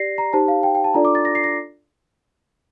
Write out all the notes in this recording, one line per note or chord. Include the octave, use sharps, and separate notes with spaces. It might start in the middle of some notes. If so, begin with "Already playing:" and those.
Already playing: G4 D5 A#6 C7
A#5
D#4 G4 C5 A5
F5
G5
G5
A5
D4 F4 A4 D5 A#5
D6
A6
A#6
C7
A#6